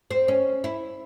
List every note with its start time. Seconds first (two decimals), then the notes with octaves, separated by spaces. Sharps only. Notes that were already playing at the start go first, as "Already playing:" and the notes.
0.11 C4
0.28 C#4
0.64 E4